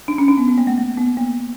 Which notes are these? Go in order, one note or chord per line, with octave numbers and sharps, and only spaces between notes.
D4
C#4
D4
B3
B3
A#3
A3
A3
B3
A#3